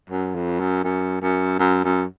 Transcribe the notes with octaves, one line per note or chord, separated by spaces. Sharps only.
F#2
F2
F#2
F#2
F#2
F#2
F#2